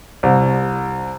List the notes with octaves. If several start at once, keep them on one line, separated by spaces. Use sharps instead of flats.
C2